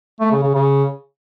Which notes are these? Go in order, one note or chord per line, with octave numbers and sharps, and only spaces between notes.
A3
C#3
C#3
C#3